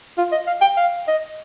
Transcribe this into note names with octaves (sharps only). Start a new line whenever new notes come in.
F4
D#5
F5
G5
F5
D#5